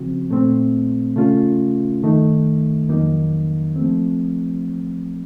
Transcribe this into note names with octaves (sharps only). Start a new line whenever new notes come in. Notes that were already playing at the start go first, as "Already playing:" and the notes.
Already playing: C#3 F3 C4 F#4
A#2 A3 C4
C#3 A3 C#4 F4
F#2 D#3 A3 D#4
F2 D#3 F#3 A#3 D#4
F3 A3 C4